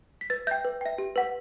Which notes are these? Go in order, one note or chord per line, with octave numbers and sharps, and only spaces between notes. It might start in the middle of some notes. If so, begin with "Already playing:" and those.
B6
B4 A6
E5 G5 G6
B4
E5 G5
G4
B4 F#5